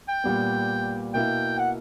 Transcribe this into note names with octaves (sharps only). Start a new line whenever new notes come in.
G5
A#2 G3 B3
B2 A#3 E4 G5
F#5